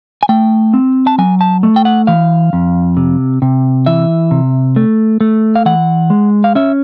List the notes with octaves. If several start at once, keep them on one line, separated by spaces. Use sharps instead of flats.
G#5
A3 G5
C4
A5
F#3 G#5
A5
A3
G5
F#5
E3 F5
F2
C3
C3
E3 E5
C3
A3
A3
F5
E3 F#5
G#3
F5
C#4 E5